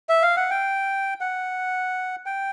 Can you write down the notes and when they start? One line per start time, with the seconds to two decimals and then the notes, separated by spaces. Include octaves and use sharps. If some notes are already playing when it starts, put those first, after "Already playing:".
0.09 E5
0.22 F5
0.37 F#5
0.51 G5
1.21 F#5
2.26 G5